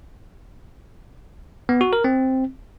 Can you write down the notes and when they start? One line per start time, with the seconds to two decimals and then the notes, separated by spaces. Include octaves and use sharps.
1.69 B3
1.81 F#4
1.93 A#4
2.04 C4